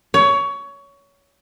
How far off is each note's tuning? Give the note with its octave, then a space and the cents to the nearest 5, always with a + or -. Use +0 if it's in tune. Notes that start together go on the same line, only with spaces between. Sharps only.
C#5 +20